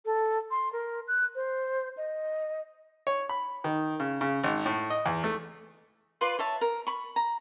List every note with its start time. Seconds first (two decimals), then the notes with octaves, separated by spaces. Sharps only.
0.05 A4
0.51 C6
0.73 A#4
1.08 F#6
1.35 C5
1.97 D#5
3.07 C#5
3.29 B5
3.64 D#3
4.00 C#3
4.21 C#3
4.44 G#1
4.66 A2
4.90 D#5
5.06 E2
5.24 A3
6.21 F4 B4 D5 C6
6.39 C#5 E5 A5
6.61 A#4
6.87 B5 C#6
7.16 A#5